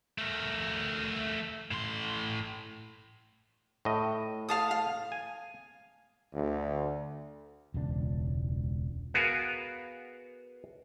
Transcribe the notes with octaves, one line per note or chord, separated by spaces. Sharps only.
A3 A#4
A2 C6
A2 D#5
F5 A5 D#6
F5
G#5
D2
E1 C#2 C#3 D4
B3 F#4 G#4 A#4 F5 G#5